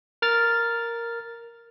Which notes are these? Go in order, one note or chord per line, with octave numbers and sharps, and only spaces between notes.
A#4 F6 A6